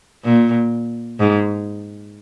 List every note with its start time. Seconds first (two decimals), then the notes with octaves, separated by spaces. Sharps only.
0.24 A#2
1.19 G#2